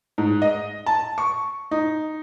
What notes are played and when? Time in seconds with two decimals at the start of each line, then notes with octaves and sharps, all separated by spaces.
0.18 G#2
0.42 D#5
0.86 A5
1.18 C#6
1.71 D#4